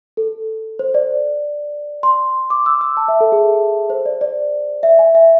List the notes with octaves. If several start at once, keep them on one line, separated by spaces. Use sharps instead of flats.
A4
C5
D5
C6
D6
E6
E6
A5
E5
A4
G#4
C5
D5
D5
E5
G#5
E5